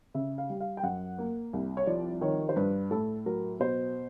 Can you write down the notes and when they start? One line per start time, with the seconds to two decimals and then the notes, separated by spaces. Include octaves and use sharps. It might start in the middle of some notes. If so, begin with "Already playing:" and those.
0.14 C#3 E5
0.38 F5
0.50 G3
0.61 F5
0.77 G5
0.83 F#2 F#5
1.18 A#3
1.53 C2
1.77 C#5
1.87 F3 D5
2.21 D#3 C#5
2.49 C5
2.56 G2 B4
2.91 A2 A4
3.26 F#3 A#4
3.60 B2 C5